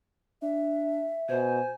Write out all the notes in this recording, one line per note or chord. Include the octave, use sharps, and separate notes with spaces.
D4 E5
B2 C5 G#5